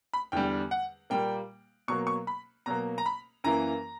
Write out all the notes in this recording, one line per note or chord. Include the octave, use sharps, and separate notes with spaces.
B5
E2 D3 G3 G5
F#5
A#2 G3 A#3 G5
B2 F#3 A#3 C#6
C#6
B5
B2 F#3 A#3 A#5
A#5
B5
F#2 E3 A#3 A#5